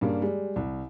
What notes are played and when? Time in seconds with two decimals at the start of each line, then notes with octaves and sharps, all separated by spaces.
0.01 G2 C#3 G3 A#3
0.22 G3 G#3
0.56 C2